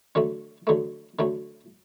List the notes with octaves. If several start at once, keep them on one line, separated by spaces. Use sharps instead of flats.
D3 F#3 A3
D3 F#3 A3
D3 F#3 A3